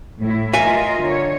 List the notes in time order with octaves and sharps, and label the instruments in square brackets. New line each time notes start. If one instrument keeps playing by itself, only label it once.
[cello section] A2 E4
[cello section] F4 A#4 D#5 [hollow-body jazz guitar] E5 G#5
[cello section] D3 C#5